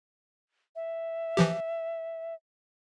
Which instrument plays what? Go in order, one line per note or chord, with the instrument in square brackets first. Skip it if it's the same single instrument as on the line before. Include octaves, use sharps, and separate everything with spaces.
[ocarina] E5
[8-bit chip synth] E3 F3 G4